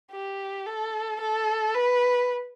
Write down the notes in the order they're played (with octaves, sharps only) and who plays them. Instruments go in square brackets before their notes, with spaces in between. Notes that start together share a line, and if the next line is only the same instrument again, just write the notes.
[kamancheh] G4
A4
A4
B4